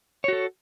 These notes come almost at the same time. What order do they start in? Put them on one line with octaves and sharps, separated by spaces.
C#5 F#4 A4